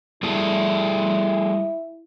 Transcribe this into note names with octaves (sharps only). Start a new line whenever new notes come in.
G3 E4 G#4 A4